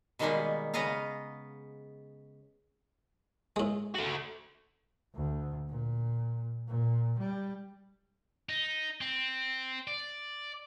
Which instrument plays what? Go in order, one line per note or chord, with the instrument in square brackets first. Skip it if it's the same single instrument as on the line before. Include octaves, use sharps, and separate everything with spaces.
[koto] B2 D#3 G3 G#3 A#3 B3
C#3 B3 D#5 F5 A#5
[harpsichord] A2 G#3
[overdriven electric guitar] A3 F#4
[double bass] D2
A#2
A#2
G3
[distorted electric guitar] D#4
C4
D5